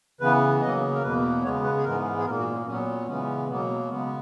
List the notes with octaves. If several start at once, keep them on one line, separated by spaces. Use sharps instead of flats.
C#3 E3 B3 B4
C#3 F#3 A#3 D#5
A#4
E2 B2 A#3 B4
C#3 G#3 B3 C#5
B4
G#4
G#2 E3 G#3 B3 A#4
G#4
A#2 A#3 A#4
F#4
C#4
A#2 F#3 B3 C#4
C#3 E3 G#3 B3 C#4
B2 F#3 A#3 B3
C#3 G#3 B3